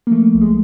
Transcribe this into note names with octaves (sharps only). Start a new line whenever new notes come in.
A#3
F3 A3
B1
G#3